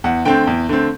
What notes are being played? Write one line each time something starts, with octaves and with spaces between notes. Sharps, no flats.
E2 F#5
D3 A3 C4 G5
E2
D3 A3 C4